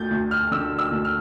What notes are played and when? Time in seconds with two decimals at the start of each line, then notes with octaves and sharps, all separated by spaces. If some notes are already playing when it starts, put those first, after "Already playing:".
Already playing: D2 A3 G6 A6
0.11 D2
0.31 F6
0.51 D3 E6
0.79 E6
0.92 D2
1.05 F6